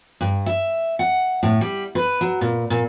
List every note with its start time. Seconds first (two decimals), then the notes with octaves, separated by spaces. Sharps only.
0.21 G2
0.46 E5
0.99 F#5
1.43 A2
1.61 G3
1.95 B4
2.21 F#3
2.41 A#2
2.70 A#2